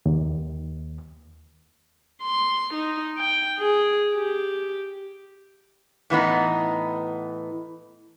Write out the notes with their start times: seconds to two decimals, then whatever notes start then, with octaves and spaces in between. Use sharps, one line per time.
0.06 D#2
2.22 C6
2.74 D#4
3.18 G5
3.59 G#4
4.14 G4
6.10 A2 E3 B3 D#4